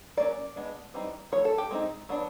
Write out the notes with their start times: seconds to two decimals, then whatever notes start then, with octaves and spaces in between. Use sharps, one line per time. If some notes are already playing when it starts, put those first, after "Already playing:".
0.17 F#3 A#3 C#4 D5
0.56 G#3 B3 D4
0.94 E3 G3 C4 D#4
1.32 F3 A3 C#5
1.45 A4
1.58 G4
1.71 G#3 C4 D#4
2.09 F#3 B3 D4